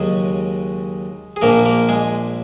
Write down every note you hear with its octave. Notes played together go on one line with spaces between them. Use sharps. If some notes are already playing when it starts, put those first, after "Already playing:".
Already playing: D#2 C#3 F#3 G#3 G#4
G#4
A#1 A#2 F3 A#3 A#4
A#3 A#4
G#3 G#4